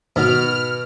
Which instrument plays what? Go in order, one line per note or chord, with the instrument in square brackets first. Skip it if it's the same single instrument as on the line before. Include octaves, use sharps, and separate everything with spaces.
[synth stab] G#2 D#3 F#4 [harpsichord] B2 [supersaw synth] F6